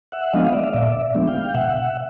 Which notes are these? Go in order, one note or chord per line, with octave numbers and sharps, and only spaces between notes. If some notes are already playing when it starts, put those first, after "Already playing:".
E5 F#5
F3 G#3 B3 D4 D#5 F5
D5 E5
F5
A#2 D5 E5
F3 G#3 B3 D4
F5 G5
B2 E5 F#5